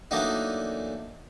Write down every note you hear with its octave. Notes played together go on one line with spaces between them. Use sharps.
E3 F#3 A3 A#3 D4 D#4